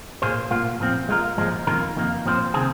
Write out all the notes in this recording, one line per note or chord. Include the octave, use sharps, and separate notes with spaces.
A#2 A#3 G#4 C5
A#2 A#3 F4
A#2 F3 C4
G#3 F4 A#4
A#2 F3 G#3
F2 D#3 A#3 F4 A#4
F2 D#3 A#3
A#2 F3 C4 G#4 C5
C3 D#3 C4 G#4